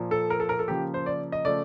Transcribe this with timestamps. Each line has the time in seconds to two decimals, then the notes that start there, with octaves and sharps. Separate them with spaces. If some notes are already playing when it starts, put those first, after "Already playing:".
Already playing: A#2 F3 A#3
0.11 A4
0.30 A#4
0.40 A4
0.49 A#4
0.59 A4
0.68 C#3 F3 A#3 G4
0.94 C5
1.06 D5
1.32 D#5
1.45 C#3 F3 A3 D5